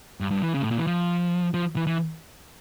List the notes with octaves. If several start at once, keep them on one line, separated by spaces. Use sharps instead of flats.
G2
G2
E3
C#3
A2
A#2
E3
F3
F3
E3
E3